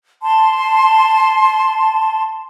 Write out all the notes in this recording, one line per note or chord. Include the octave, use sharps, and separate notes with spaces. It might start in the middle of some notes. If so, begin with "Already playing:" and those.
A5 C6